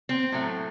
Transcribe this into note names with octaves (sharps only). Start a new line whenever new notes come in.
C4
A2 F#3 A3